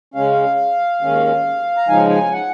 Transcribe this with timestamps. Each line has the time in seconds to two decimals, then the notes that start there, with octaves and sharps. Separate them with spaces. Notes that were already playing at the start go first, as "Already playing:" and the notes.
0.14 C#3 G#3 C#4 F5
1.01 D#2 D#3 G#3 C#4
1.77 A#5
1.88 C#3 F3 G#3 D#4 G#5
2.10 G#5
2.32 F#5